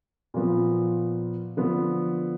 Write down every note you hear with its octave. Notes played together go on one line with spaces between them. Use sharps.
A#2 F3 B3
D3 F3 B3